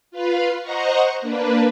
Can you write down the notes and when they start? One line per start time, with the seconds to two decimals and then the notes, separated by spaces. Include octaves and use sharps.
0.11 F4 B4 F5
0.62 C5 D#5 F#5 A#5 C#6
1.21 A#3 D4 B4